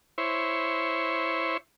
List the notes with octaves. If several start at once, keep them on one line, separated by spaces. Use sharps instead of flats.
E4 C5 C#5